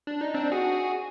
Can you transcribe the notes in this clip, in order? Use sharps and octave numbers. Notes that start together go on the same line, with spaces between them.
D4
D#4
C4 D4
F#4 G#4